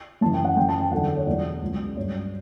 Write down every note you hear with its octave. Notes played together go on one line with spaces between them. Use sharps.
F#2 C#3 E3 A5
G5
F#5
F#2 E3 G5
A5
G5
E2 D3 F#3 F#5
C#5
E2 B2 F#3 D5
C#2 C#3 F#3
G2 F#3 C#5